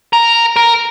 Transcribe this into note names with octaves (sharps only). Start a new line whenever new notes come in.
A#4
A#4